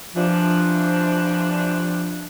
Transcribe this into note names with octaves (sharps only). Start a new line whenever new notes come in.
C3 E3 F3 D4